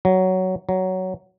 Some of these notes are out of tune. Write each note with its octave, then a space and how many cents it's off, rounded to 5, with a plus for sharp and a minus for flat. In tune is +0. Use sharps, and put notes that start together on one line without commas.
F#3 +10
F#3 +10